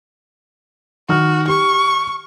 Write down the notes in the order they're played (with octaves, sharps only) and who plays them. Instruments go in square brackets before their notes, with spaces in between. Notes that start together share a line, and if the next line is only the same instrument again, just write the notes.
[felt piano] D#3 F6 [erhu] F#4
[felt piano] G4 [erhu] C#6